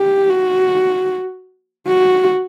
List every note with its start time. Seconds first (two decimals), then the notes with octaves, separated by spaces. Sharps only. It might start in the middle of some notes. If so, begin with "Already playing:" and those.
Already playing: G4
0.30 F#4
1.87 F#4